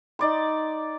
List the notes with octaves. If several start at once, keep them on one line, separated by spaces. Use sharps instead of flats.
D#4 D5 C6